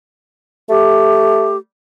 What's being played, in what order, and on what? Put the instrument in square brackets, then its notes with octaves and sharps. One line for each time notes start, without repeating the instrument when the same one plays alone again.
[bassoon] A3 [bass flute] G4